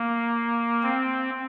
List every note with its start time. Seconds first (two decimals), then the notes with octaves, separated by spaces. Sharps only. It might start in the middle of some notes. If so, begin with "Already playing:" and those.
Already playing: A#3
0.83 C4